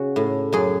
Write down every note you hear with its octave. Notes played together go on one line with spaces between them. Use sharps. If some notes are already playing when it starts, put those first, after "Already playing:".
Already playing: C#3 F#4
A2
F#2 G#4